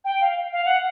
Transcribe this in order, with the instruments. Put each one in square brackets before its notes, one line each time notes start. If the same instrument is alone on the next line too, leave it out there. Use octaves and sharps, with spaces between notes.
[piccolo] G5
F5
F5
F#5